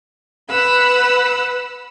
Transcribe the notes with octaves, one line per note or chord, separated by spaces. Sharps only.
B4 F#5 B5 E6